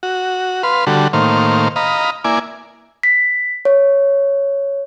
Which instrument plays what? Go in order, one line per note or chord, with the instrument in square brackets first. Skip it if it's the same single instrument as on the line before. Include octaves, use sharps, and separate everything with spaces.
[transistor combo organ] F#4
B4 F5 C6
D3 G3 F#4 A4
A2 D#3 A#3 C5 F5
D#5 F5 A#5 B5
A#3 E4 D5 G#5
[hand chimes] B6
C#5